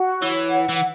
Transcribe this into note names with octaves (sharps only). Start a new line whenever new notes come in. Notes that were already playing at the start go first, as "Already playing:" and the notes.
Already playing: F#4
E3 C#5
F#5
E3